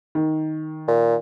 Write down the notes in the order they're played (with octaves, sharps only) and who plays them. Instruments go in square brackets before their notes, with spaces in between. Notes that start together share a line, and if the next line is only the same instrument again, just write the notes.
[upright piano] D#3
[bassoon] A#2